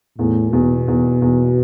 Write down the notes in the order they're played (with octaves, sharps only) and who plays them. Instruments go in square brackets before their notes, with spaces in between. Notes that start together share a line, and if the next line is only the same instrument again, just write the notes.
[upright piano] E2 [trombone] A2
[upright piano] E2 [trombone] B2
[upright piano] E2
E2